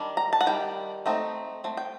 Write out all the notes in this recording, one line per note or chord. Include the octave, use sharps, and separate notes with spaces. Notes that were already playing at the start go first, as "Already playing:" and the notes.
Already playing: D#3 G3 D4
A#5
A5
F#5
D#3 G3 G5
A3 C4 D#4
A3 C4
G5